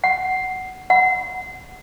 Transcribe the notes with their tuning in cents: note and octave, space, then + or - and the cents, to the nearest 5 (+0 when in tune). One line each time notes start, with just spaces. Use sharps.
F#5 +15
F#5 +5